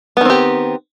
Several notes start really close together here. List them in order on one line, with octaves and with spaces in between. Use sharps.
B3 D#3 C4 G4